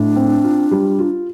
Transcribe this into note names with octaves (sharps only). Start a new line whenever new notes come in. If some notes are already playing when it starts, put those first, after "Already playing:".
Already playing: A2 D4
C4
F4
G3
F4